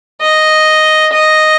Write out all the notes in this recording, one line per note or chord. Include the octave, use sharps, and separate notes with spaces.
D#5
D#5